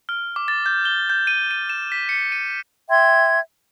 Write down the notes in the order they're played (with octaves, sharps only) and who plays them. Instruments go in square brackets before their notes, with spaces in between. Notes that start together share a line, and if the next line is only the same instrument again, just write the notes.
[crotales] F6
D6
A6
G6
G7
G6
D#7
D#7
E7
B6
C#7
D#7
[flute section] E5 G5 C6 G#6